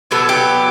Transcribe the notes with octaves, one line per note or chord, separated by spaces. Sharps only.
B2 F#3 B3 D4 A4
G4